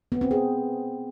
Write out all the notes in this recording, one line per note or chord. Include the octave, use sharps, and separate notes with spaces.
B3
C4
G#4